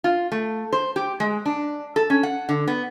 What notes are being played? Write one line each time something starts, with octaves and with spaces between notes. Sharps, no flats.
F4
A3
C5
G4
G#3
D4
A4
C#4
F#5
D3
B3